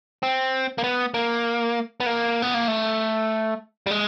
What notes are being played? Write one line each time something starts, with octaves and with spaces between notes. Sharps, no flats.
C4
A#3
B3
A#3
B3
A#3
B3
A#3
A3
G3
G#3